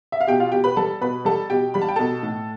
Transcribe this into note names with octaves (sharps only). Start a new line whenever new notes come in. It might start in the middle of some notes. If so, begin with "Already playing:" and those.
E5
F5
B2 G4 G5
F4 F5
B2 G4 G5
B4 B5
G3 A4 A5
B2 B4 B5
G3 A4 A5
B2 G4 G5
G3 B5
A5
G5
B2 A4 A5
A2